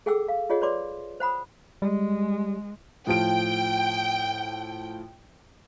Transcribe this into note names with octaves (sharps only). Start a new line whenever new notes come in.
G#4 A4 F#5 G5 D6 E6
F5
F4 G#4 C#5 D#5 F#5
B4 C#5 D5 C6 D6
C5 F#5 B5 D#6
G3 G#3
A2 F3 G5 D7